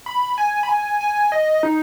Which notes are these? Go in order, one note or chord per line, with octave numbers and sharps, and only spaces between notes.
B5
G#5
B5
G#5
G#5
D#5
D#4